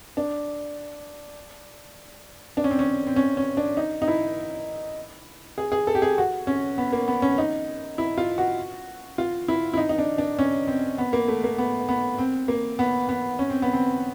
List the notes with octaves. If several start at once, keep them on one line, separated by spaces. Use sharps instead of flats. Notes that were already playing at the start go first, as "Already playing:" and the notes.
D4
D4
C#4
C4
C#4
C4
C#4
C#4
D4
D#4
D#4
E4
G#4
G#4
A4
G4
G#4
F#4
C#4
B3
A#3
B3
C#4
D#4
E4
F4
F#4
F4
E4
E4
D#4
D#4
D4
D4
C#4
C4
B3
A#3
A3
A#3
B3
B3
C4
A#3
B3
B3
C#4
C4
B3
C4